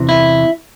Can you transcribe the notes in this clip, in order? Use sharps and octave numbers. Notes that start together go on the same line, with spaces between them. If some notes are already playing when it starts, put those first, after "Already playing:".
Already playing: E2 C3 E3
E4